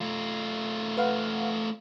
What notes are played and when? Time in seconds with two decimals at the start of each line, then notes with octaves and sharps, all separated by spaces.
0.01 A3 F4
0.97 B4 F5 F#5